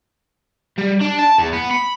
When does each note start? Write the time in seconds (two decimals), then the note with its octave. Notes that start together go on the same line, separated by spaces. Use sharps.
0.78 G3
1.02 D4
1.19 A5
1.39 E2
1.53 B3
1.71 B5